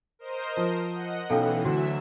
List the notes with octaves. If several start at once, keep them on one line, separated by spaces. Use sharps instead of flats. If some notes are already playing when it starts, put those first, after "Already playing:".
A#4 C5 D#5
F3
D#5 F#5
B1 E3 C#4 A4 F5 G5
D2 F#3 F#4 E5 E7